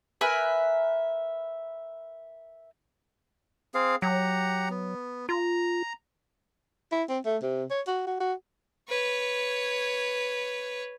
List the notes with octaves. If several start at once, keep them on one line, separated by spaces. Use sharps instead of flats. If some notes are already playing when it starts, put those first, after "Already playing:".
A#4 B4 E5 G#5
C4 G#4 F5
F#3 G4 F#5 A#5
B3
F4 A#5
E4
C4
A3
C3
C#5
F#4
F#4
F#4
B4 C#5